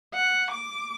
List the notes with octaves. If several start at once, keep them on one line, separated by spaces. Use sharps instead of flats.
F#5
D6